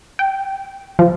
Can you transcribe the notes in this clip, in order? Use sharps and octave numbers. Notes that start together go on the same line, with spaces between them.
G5
F3